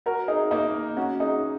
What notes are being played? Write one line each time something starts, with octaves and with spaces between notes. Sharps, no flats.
F#4 A#4
D#4 G#4
A#3 D#4
C#4 F#4
D#4 G#4